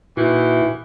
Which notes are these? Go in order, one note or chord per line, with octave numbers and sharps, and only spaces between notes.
A#2 D#3 E3 E4 F#4